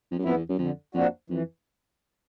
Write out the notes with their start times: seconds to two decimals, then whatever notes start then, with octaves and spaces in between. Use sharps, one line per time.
0.11 F2
0.18 F#2
0.23 F2 B3 E4
0.35 E2
0.49 F#2
0.59 F2 D3
0.94 F2 F3 A#3 D4 F#4
1.30 F2 E3